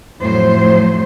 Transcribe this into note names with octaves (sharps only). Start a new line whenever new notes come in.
F2 A2 F#3 C5